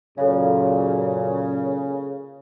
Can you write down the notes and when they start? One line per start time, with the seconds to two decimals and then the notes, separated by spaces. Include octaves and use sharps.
0.18 F#2 A#2 C#3 A4 C#5 F5